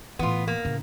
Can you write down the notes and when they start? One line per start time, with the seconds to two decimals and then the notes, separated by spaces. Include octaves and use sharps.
0.19 A2 E3 B3 F4
0.48 A#3
0.65 A1 C#3